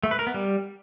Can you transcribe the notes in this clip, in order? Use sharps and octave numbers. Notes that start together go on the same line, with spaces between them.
A3
B4
A#4
B3
G3